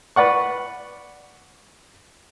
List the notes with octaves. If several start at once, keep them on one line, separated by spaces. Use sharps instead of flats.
B4 D5 F#5 C#6